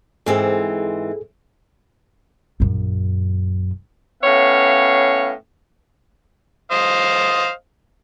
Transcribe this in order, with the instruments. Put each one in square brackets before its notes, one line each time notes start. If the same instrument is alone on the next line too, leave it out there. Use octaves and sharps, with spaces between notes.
[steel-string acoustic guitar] G#2 E3 C4 [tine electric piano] G#4 A4
[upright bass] A#1 F#2
[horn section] A2 B3 C#4 C#5 F5
[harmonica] C5 D#5 F5